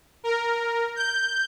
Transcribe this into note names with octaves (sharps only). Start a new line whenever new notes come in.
A#4
G6